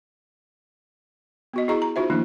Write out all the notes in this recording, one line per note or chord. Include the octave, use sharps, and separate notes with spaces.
B3 F#4 D#5
E4 F#4 G#4 D#5 A#5 C#6
A#5
D#4 F4 F#4 C5 E5
D#3 F3 A3 A#3 D4 E4